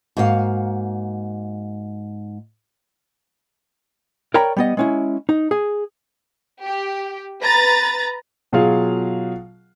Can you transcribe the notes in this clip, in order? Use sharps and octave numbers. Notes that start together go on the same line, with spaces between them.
G#2 A#3 F#4 G4 F5
A#4 C#5 D5 G5 A#5 B5
G3 B3 D#5
G#3 C#4 E4
D#4
G#4
G4
B4 A#5 A6
B2 F#3 F4 G#4 F5